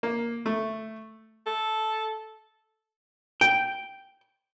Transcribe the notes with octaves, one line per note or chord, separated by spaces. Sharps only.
A#3
A3
A4
G5